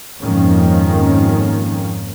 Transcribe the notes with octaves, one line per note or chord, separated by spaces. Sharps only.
F2 G#2 D#3 F3 A#3 C#4